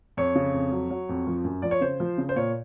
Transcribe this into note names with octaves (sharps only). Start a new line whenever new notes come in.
F2 C#5
C#3
F2
F#3
F#3
F2
F3
F#2
F3 D5
C#5
C#3 C5
F3
C#3
C5
A#2 C#5